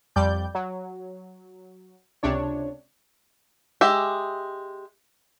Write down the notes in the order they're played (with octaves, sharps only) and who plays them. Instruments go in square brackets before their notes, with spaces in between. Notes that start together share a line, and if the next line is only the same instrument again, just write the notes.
[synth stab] F2 G3 D5 G6
F#3
C#2 C3 D4 C#5
[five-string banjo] G#3 G4 E5